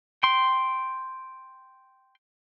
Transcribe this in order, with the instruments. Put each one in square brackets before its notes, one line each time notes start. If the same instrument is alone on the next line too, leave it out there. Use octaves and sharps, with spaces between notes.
[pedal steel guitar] G5 C6